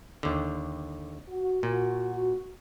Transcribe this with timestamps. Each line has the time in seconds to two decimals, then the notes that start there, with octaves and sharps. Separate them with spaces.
0.23 D#2 D3
1.29 F#4
1.63 A#2